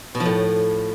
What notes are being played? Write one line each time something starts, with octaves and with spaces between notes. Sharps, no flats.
B2
F3
A2